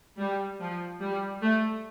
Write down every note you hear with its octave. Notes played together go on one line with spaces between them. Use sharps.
G3
F3
G3
A3